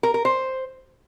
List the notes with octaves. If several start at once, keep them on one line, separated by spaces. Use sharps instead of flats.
A#4
A#4
C5